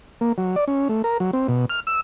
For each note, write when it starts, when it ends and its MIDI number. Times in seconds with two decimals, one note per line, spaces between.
0.21 0.32 58
0.38 0.56 54
0.56 0.65 74
0.68 0.88 61
0.89 1.02 57
1.04 1.18 70
1.20 1.31 54
1.33 1.47 60
1.48 1.65 47
1.70 1.80 89
1.87 2.01 88